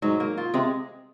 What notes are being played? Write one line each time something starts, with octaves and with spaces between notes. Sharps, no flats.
G#2 F#3
A#3
F4
C3 G#3